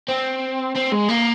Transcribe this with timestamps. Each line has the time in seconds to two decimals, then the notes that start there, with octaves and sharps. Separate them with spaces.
0.08 C4
0.76 C4
0.92 G#3
1.09 A#3